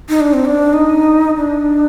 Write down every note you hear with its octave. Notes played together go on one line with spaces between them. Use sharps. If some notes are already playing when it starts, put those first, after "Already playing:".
D#4
D4
C4
D4
D#4
D4